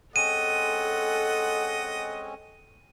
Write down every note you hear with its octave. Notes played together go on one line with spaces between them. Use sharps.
G#3 C4 C#4 A4 D#5 F#5 D#7